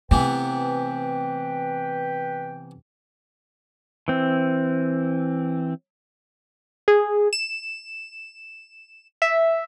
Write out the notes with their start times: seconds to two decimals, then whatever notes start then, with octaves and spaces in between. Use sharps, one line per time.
0.11 C3 E3 A3 B3 B4 G5
4.08 E3 C4
6.88 G#4
7.33 E7
9.22 E5